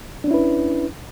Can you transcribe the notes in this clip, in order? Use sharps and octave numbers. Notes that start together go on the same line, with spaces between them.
C#4 D4 E4 B4